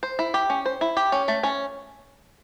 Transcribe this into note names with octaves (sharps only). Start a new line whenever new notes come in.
C5
E4
G4
C#4
C5
E4
G4
C#4
A3
C#4